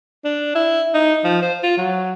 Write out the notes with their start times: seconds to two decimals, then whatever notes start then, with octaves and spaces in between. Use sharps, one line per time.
0.24 D4
0.55 E4
0.94 D#4
1.24 F3
1.42 C5
1.63 F4
1.77 F#3